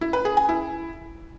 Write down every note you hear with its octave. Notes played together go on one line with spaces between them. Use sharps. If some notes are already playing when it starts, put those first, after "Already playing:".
E4
B4
G#4
G#5
E4